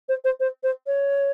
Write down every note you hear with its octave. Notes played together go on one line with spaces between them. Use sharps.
C5
C5
C5
C5
C#5